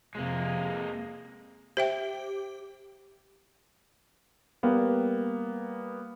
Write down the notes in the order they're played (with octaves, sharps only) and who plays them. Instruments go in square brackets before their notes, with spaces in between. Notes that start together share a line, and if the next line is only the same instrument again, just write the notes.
[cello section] F2 C3 [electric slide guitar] G#3 A#3
[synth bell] G4 [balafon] C5 E5 G5
[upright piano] G3 A#3 B3